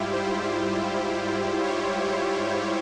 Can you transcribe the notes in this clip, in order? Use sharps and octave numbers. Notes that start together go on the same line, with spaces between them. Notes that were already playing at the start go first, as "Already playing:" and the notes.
Already playing: G#2 G3 E4 F4 G4
C5
C5
C#5
C5